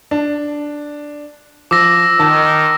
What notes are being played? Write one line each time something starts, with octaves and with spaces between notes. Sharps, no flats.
D4
F3 D6 E6 A#6
D#3 A5